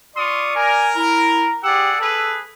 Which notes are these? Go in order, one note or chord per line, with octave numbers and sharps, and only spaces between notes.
F4 D5 C6 C#6 D#6
A#4 G#5
E4 A#5
G4 G#4 D5 F#5 E6
G#4 A4 B4